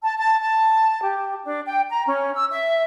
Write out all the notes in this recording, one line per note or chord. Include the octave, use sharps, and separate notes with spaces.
A5
A5
A5
G4
D4
G5
A#5
C#4
E6
E5